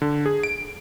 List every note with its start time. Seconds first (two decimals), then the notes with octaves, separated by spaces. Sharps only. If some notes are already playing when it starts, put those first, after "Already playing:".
0.02 D3
0.26 G#4
0.43 D7